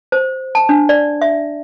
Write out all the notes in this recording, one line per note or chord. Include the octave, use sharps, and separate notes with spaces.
C5
A5
D4
D5
E5